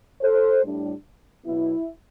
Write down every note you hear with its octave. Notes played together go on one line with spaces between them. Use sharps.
A4 C5
A2 G3 D4
B2 F#3 B3 E4